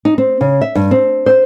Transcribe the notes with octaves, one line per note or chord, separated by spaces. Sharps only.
D#4
C4
C#3
E5
G2
C4
C5